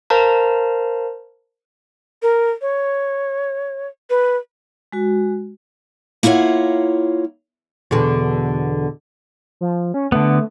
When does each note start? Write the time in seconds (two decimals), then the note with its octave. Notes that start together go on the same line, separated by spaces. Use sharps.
0.10 A#4 C5 F5 A5 A#5
2.22 A#4
2.61 C#5
4.10 B4
4.92 G#3 F#4
6.23 A#3 E4 F4 C#5 F#5
7.91 E2 B2 D3
9.61 F3
9.94 C#4
10.12 D3 A3 B3